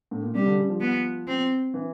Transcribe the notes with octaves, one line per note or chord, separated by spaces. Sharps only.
A2
A#2
C3 G3
D3
C#3
F3
B3
C4
E3